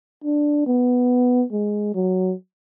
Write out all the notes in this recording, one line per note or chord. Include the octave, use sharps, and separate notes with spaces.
D4
B3
G#3
F#3